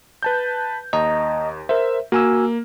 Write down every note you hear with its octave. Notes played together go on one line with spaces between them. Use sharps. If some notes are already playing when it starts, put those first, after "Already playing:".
B4 A5 G6
D#2 D#5 A#5
A#4 C5 E5
A#3 F#4 G#5 E6